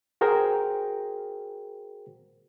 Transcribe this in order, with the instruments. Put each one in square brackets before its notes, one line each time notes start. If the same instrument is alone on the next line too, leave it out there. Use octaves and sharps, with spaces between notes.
[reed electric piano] F#4 G#4 A#4 C5 G5